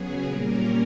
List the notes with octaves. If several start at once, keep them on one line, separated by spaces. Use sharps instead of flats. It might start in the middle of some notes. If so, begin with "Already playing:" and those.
Already playing: C#3 F#3 B3 G#4
A#2 G3 A#3 C#4 A#4